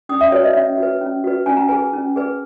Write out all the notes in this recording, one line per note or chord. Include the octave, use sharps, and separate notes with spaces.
C#4 D#6
E5
F#4 B4 C#5
D#5
C#4 E5
F#4 B4
C#4
F#4 B4
C#4 G#5
A#5
G#4 B4 G#5
C#4
G#4 B4